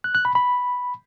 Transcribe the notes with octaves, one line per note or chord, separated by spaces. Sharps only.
F#6
F#6
B5
B5